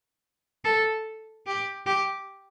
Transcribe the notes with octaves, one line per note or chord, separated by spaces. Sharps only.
A4
G4
G4